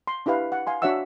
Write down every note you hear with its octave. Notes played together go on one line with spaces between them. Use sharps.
C6
D4 E4 G4 B4 F5
F#5
F5 G#5 C6
D4 F#4 C#5 E5 F#5 E6